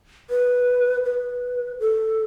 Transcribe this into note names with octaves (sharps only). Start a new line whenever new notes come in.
B4
B4
A4